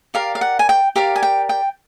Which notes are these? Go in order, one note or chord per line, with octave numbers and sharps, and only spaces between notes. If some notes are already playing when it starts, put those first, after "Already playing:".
G4 A#4 D5 F5
F5
F#5
G#5
G5
G4 A#4 D5 F5
G#5
G5
G5